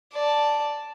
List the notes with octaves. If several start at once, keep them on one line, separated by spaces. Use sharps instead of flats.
D5 A5